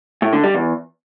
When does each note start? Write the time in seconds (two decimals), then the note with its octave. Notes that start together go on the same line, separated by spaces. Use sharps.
0.22 A2
0.33 D3
0.44 G3
0.54 E2